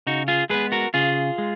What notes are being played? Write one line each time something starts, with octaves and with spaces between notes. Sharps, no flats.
C#3 D#4 F#4
F4 G#4
G#3 B3 G#4 B4
F#4 A#4
C#3 F4 G#4
G#3